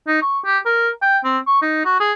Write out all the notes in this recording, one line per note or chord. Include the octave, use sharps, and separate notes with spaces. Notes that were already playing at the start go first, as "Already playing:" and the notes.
D#4
C#6
G4
A#4
G5
C4
C#6
D#4
F#4
G#4